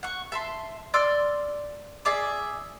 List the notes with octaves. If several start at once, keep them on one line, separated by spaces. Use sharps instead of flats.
F#5 C#6
E5 A5 C6
D5 C6 E6 F6
G#4 D5 E5 D6